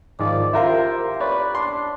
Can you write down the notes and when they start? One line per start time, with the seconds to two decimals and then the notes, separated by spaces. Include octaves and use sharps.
0.19 G#2 D#3 F3 D5
0.53 E4 F4 G4 A#4 C5 E5
1.20 B4 C#5 D5
1.55 D4 C6